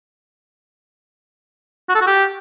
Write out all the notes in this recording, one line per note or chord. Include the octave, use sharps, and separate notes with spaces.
F#4
A4
F#4
G4